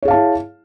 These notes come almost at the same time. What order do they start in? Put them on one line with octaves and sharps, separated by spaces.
C#5 G#4 F5 A5 E4